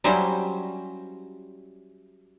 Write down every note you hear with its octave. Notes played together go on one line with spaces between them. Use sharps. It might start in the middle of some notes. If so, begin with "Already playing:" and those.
F#3 G3 C#4 E4 C5